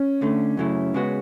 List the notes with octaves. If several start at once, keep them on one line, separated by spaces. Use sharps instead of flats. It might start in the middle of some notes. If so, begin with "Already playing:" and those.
Already playing: C#4
D2 D3 A3
F#2 C#3 F#3 A3 E4
C#3 G#3 B3 F#4